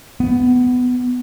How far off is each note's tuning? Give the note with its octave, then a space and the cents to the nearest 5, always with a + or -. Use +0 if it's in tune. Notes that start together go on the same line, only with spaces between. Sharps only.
B3 +15